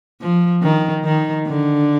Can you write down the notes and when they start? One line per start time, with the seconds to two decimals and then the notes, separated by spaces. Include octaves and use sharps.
0.21 F3
0.63 D#3
1.04 D#3
1.47 D3